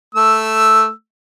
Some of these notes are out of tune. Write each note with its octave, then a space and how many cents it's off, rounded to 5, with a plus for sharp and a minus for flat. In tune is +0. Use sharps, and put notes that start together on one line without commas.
A3 +0 E6 +0